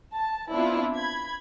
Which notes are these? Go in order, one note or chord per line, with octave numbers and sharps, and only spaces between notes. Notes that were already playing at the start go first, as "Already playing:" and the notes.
A5
B3 C4 D4 E4 F4
B5 G#6